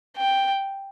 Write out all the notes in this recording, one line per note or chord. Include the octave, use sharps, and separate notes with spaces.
G5